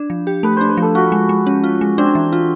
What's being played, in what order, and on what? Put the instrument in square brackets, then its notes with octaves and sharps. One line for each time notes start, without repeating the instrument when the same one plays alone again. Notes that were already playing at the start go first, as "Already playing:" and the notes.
Already playing: [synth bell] D4
F3
G4
[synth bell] A3 [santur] B4
[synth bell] D4 [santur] C5
[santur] B4
[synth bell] F3 [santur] A4
[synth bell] F4 [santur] F#4
[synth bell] G#3
G#3
C#4
F4
G#3
[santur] C4 [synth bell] D4
[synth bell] E3
F4